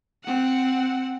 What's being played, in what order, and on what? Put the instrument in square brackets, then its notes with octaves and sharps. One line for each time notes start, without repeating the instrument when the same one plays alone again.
[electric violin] C4 F#5